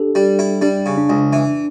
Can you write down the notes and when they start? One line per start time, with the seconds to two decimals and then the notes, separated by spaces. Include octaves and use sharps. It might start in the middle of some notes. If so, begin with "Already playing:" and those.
Already playing: D4 G4 A4
0.15 G3
0.39 E4
0.61 G3 D4
0.86 C#3
0.97 D4
1.09 C#2
1.33 E3